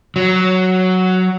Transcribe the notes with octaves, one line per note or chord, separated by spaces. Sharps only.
F#3